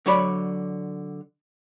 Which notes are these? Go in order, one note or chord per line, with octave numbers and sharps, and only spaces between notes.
D3 F#3 C#5 D5 B5